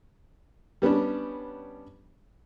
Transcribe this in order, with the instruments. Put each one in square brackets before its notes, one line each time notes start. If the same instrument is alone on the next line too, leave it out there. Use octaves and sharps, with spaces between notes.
[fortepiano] G3 B3 C#4 D4